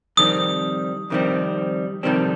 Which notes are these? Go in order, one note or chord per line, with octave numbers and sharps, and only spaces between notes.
F2 C3 D#3 G3 C4 D#6
F2 C3 D#3 G3 C4
F2 C3 D#3 G3 C4